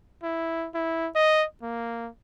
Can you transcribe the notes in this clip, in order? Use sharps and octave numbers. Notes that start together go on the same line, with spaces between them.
E4
E4
D#5
A#3